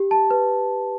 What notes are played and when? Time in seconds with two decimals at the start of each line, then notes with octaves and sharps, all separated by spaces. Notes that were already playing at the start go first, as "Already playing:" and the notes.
Already playing: G4
0.11 A5
0.31 B4